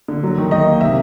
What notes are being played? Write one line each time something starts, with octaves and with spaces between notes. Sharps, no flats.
D3
F#3
D#3
D#3 D#5
A#3
C3 E5